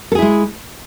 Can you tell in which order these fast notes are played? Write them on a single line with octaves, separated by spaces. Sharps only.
A4 G#4 E4 G#3